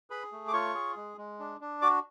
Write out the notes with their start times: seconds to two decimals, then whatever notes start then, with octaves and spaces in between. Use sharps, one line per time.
0.10 G#4 B4 B5
0.32 A3
0.48 D6
0.53 F4 C#5 C#6
0.75 G#4
0.97 G#3
1.18 G#3
1.40 D4
1.61 D4
1.82 F#4 D5 D6